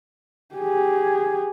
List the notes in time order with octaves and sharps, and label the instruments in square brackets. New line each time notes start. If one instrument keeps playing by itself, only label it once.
[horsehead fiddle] G4 G#4